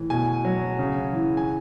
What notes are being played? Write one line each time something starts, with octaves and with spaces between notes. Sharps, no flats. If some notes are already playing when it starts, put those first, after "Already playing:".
Already playing: A2 E3
B2 G#5
F#3
C#3
E3
G#5